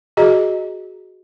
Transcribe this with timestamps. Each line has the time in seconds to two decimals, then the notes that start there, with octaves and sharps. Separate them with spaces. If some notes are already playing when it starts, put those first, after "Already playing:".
0.17 F#4 G#4 D#5 A#5